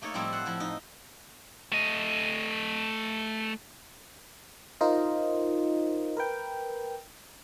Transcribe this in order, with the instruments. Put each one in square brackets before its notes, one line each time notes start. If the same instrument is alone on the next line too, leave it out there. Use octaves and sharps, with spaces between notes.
[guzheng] A3 A#3 D#4 A4 C#5
A2 F3 G3 A3 C4 E4
C5 F#5
F3 E4
D#4
[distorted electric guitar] A3 D#5
[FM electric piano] D#4 F4 A#4 C5 D#5
A#4 B4 G5